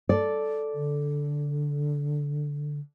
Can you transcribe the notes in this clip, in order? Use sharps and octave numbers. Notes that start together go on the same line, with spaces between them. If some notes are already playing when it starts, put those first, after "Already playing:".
A4 D5
D3